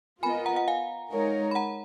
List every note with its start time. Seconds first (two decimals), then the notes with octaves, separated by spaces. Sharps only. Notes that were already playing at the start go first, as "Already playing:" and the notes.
0.23 B3 F4 A#4 D#5 G#5 B5
0.46 F#5 A#5
0.56 F#5
0.68 F5 G#5
1.12 G#3 D#4 A#4 C#5
1.51 B5
1.55 F#5 A#5